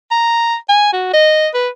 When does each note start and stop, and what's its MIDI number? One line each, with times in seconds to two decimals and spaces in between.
0.11 0.55 82
0.69 0.92 80
0.93 1.11 66
1.13 1.48 75
1.54 1.69 71